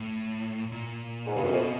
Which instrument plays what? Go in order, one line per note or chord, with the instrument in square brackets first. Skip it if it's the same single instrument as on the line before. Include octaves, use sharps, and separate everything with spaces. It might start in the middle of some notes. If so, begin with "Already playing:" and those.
Already playing: [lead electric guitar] A2
A#2
[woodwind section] G#2
[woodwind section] G2 [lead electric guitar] C#3
[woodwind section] F#2 [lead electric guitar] C3
[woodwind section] F2 [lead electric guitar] B2